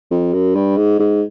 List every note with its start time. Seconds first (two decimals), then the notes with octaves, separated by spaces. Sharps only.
0.11 F2
0.33 F#2
0.55 G2
0.77 G#2
1.00 G#2